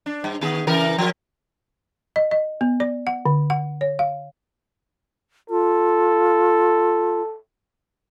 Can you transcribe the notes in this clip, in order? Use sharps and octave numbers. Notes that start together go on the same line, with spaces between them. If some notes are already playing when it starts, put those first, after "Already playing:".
D4
G2
D#3 B3 G#4
C#3 E3 A#4
F3 A#4
D#5
D#5
B3
D5
F#5
D3
F#5
C#5
F5
F4 A4